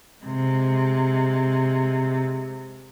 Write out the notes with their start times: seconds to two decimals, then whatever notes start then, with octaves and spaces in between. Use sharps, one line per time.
0.24 C3 G#3